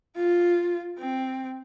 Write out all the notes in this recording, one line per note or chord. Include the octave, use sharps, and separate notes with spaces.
F4
C4